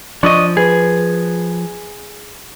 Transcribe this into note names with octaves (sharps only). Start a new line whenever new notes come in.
F3 D4 D#5 C#6 D#6
G#4 B4